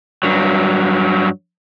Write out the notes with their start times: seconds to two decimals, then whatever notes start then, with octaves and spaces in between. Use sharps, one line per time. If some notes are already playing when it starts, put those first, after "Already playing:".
0.23 G2 F#3